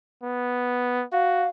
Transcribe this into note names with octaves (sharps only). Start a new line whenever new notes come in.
B3
F#4 F5